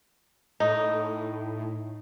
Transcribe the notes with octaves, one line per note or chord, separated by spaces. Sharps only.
A2 D#4